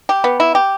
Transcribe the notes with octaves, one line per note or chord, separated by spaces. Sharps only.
G4
B3
E4
G4